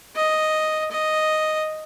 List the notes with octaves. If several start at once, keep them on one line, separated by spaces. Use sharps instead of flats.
D#5
D#5